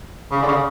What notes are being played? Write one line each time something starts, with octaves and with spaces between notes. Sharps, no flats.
C#3
D3
C#3